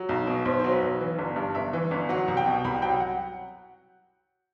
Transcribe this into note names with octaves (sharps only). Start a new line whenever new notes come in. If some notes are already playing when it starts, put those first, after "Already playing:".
Already playing: F#3
B1
B2
B1 C5
F#3 C5
B4
B1
E3
G1
G2
G1 E5
E3
G1
F#3 F#5
C2
G5
B2
C2 B5
F#3 G5
F#5